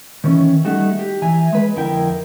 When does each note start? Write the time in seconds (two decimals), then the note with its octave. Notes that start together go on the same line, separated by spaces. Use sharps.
0.24 D#3 E3 C#4
0.65 G3 A3 D#4 F#4
0.99 G4
1.22 E3 E5 G#5 A#5
1.53 G#3 B4
1.76 F2 D3 E4 A#4 G5